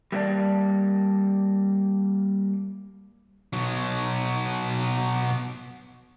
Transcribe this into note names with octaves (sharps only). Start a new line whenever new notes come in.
G3 A3 A#3 F#4 D5 A5
B2 F#3